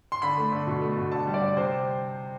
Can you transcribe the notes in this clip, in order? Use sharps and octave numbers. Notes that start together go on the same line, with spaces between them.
C6
D3 B5
A3
D3
B2
A3
B2
D3 A5
G3
D5
D3
C3 C5